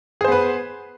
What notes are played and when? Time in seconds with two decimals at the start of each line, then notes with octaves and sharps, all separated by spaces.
0.21 G#4
0.24 C5
0.28 B3
0.32 B4